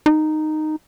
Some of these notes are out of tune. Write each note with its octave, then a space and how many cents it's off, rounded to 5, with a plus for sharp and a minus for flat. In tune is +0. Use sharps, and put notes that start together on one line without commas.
D#4 -10